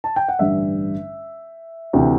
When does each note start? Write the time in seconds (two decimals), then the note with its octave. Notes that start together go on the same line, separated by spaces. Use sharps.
0.04 A5
0.16 G5
0.28 F#5
0.39 A1 G2 D3 G3 D4 E5
1.93 D2 C3 E3